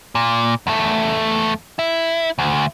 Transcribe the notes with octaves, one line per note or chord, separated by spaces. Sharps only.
A#2
E2 A3
E4
D2